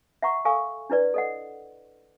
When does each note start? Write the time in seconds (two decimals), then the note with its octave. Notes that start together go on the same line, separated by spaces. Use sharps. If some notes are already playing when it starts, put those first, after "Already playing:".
0.22 E5 F#5 A#5 C#6
0.45 A4 A#4 F5 G#5 C#6 E6
0.90 D4 E4 B4 D5
1.14 A4 D#5 F#5